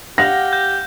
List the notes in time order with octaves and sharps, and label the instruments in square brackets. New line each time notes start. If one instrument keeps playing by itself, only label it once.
[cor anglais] G4 [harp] F5 F#5 [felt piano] A#6
[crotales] G6